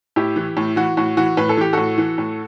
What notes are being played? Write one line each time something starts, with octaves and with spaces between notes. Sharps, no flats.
A2 E4 G4
E3
A2
E3 F#4
A2 F#4
E3 F#4
A2 B4
A4
E3 G4
A2 F#4 A4
E3
A2